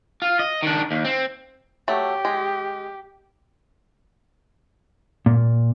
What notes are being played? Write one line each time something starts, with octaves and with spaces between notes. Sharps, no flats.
F4
D#5
D#3 D4
D#2
C4
F#3 A3 G4
G#3
A#2